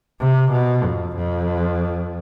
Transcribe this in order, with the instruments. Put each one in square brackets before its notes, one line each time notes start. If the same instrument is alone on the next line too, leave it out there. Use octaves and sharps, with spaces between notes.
[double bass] C3
B2
F2
F2